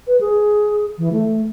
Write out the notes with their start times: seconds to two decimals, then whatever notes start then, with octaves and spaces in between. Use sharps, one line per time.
0.07 B4
0.20 G#4
0.98 E3
1.12 A3